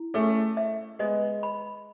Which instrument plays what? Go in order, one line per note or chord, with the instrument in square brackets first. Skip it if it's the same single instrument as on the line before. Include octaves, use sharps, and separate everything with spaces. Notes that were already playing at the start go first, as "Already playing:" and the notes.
Already playing: [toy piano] E4
[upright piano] A3 C#4 [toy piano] G#4
[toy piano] E5
[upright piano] G#3 B3 [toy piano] D#5
[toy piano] B5